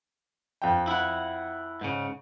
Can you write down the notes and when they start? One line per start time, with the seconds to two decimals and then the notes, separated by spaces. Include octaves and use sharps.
0.62 F2 G5
0.88 E4 F#5
1.81 G#2 C#3